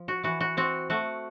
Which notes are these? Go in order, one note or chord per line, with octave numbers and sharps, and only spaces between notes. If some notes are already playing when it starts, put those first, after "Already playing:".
Already playing: F3
F#4
E3 F#4
F#4
C4 F#4
A3 F#4